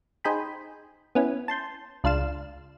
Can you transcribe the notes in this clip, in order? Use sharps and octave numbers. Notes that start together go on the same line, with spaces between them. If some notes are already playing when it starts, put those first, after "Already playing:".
D#4 G#4 C5 G5 G#5 B5
B3 C#4 E4
A5 C6 G6
C#2 D4 F4 F5 E7